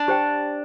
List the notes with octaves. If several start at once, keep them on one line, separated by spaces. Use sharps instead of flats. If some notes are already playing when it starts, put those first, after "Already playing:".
Already playing: D4
G4 C5 G5